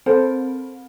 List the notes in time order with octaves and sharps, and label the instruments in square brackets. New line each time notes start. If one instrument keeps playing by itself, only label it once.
[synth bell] C4 [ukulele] A4 C5